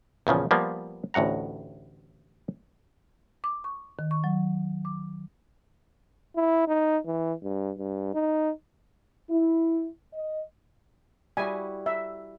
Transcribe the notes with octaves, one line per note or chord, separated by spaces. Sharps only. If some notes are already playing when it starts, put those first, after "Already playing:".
E2 A#2 C#3 F3
F3 G3 A#3 B3 F4
A1 D2 A2 F#5 A#5
D6
C#6
D#3
C#6
F#3
D6
E4
D#4
E3
G2
G2
D#4
E4
D#5
G3 E4 F#4 G#5
E5